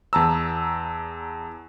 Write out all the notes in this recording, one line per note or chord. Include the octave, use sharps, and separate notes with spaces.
E2 A5 A#5 E6